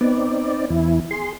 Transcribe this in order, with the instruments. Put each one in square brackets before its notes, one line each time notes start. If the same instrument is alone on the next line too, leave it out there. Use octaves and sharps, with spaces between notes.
[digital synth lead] B3 [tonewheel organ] C4 D#4 D5
[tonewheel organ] E2 E3 E4
G#4 C6